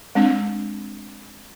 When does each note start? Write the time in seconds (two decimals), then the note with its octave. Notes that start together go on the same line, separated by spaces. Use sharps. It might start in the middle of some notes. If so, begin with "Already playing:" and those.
0.15 G#3 C4 D4